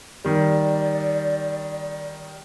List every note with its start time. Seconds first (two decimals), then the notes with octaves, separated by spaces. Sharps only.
0.25 D#3 G3 D5